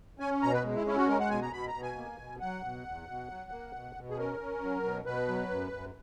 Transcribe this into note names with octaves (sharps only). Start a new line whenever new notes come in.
C#4 G#5
B2 A#5
B4
G#3
E4
C#4 E4
F#4
G#3 A#4
F#5
B2 G#5
A#5
B2 B5
A#5
B2
G#5
A#3
B2
F#3 F#5
B2
E2
B2
F#3
A#3
B2
B2
G#4
C#4 A#4
C#4
F#3
B2
B2 B4
F#3
F#2
F#2